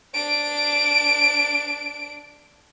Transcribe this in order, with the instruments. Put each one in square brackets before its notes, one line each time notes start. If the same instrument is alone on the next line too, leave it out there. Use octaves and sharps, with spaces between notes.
[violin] D4 D7